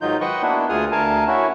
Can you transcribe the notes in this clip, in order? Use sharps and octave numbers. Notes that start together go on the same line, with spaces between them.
G#2 D#3 F#3 D#4 F4 G6
B4 C5 D#5 F#5 G5 C#6
A#3 B3 D4 E4 F#4
D2 F4 G#4 D#6 F6
D2 A#4 F5 G#5 A5
C#4 E4 F#4